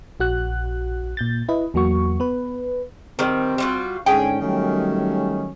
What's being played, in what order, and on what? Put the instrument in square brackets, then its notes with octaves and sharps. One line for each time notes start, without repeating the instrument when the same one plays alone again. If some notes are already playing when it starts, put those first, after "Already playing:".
[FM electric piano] A#1 F#4 F#6
A#2 G6 A6
E4 B4 D#5
E2 F#3 A#3 F#4 C#6
B3 B4
[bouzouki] D#3 G3 [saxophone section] C4
[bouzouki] G3 F4 F#4
[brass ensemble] G#2 D3 C#4 [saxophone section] G#4 [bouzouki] G5
[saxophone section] D#3 F#3 [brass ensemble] G3 A3 C#4